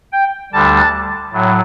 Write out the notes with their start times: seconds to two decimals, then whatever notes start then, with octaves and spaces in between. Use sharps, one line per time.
0.12 G5
0.52 D2 D3 G3 A5
1.32 A2 F#3